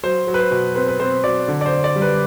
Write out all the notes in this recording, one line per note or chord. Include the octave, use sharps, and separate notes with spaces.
F#3 C5
F#3
B4
C5
B2
C4 B4
B4
C4 C5
F#3 D5
D3
D5
C5
D3
D5
G3
B4